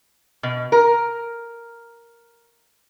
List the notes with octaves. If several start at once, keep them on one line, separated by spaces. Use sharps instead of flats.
B2
A#4